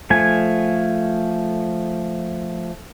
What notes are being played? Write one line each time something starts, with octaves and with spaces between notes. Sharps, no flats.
F3 A3 G#5